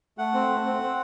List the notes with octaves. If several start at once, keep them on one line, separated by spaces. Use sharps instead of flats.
A3 F#5
C4
A3
C4
C4